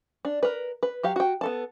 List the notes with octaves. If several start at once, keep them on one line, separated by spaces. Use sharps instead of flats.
D4
A#4 B4
B4
F#3 G4 F5
F#4 G5
B3 A4 A5